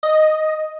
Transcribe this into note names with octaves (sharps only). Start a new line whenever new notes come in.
D#5